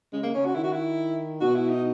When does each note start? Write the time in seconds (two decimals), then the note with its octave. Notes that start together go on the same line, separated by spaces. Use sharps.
0.12 C#3 G#3
0.23 A#3
0.34 C#3 C#4
0.45 F#4
0.55 D#3 E4
0.64 F#4
0.73 E4
1.41 B2 F#4
1.55 E4
1.70 D#4